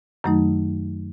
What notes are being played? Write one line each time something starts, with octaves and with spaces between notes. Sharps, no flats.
F#2 D#3 F#3 A3 D#4